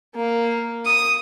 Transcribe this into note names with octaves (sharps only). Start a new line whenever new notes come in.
A#3
D#6